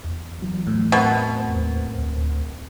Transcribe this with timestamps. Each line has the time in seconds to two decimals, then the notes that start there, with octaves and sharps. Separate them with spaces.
0.04 E2
0.42 E3 F#3
0.67 A2
0.92 B2 C4 A#4 C5
1.54 D#2
1.98 D2